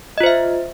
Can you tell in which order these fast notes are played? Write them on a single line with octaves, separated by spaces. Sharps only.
D#5 F4 C5 E5